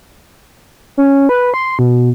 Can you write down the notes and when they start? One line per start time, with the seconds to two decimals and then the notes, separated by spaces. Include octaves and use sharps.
0.97 C#4
1.29 B4
1.54 C6
1.79 B2